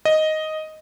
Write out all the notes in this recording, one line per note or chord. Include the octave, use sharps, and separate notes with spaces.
D#5